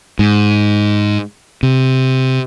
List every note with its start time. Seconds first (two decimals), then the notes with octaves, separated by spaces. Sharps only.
0.19 G#2
1.63 C3